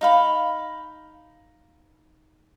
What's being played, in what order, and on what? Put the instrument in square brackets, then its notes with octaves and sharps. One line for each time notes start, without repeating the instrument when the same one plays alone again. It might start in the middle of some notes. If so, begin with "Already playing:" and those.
[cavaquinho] D#4 F5 B5